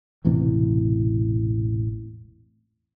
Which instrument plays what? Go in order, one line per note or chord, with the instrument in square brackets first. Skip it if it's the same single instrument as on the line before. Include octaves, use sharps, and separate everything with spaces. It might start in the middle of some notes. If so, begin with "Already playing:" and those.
[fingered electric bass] E1 A1 C3 E3